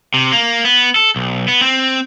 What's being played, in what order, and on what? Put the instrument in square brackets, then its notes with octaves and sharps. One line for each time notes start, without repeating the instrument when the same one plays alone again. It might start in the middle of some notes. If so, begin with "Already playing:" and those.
[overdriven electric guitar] C3
A#3
B3
A4
B1
B3
C4